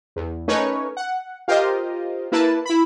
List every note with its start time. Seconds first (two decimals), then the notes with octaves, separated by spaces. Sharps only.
0.16 E2
0.48 A3 C#4 D#4 A#4 B4 C#5
0.97 F#5
1.48 F4 G4 A#4 C5 D#5 F5
2.32 A#3 E4 B4 A5
2.66 E4 B5